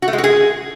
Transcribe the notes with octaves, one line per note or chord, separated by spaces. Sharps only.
F#4
A3
G#3
F#4
G#4